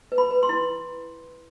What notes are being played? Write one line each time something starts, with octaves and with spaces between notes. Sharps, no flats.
B4
B5
B4
C6
E4